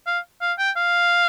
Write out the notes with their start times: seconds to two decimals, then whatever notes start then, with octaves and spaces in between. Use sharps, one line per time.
0.07 F5
0.41 F5
0.59 G5
0.76 F5